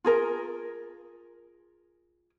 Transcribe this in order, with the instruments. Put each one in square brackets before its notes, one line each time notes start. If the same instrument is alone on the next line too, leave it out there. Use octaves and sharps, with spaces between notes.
[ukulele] F4 G#4 A#4